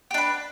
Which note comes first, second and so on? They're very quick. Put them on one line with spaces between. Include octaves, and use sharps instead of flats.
G4 D4 B4